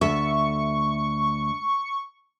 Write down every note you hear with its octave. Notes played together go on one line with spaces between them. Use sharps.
D2 A4 E5 C#6